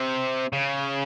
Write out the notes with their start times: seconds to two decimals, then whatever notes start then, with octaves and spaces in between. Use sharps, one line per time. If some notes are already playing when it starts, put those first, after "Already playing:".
Already playing: C3
0.53 C#3